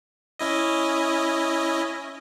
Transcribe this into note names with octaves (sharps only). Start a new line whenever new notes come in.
C#4 E4 D#5